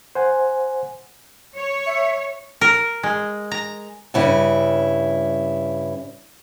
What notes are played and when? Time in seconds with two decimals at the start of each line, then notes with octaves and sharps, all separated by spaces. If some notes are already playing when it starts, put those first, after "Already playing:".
0.15 C5 F#5 G#5
1.55 C#5
1.86 E5
2.61 A#4
3.03 G#3
3.51 A#5
4.14 G2 C#3 E4